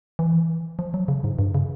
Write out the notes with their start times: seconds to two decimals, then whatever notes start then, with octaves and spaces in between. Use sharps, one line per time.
0.19 E3
0.79 F3
0.94 F#3
1.08 C#3
1.24 G#2
1.39 G2
1.54 C#3